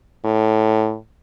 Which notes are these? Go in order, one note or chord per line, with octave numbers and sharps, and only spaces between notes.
A2